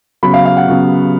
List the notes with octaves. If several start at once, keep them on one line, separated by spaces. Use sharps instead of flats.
C#3 F#3 B3 B5
F5
F5
F#5
C#3 F#3 B3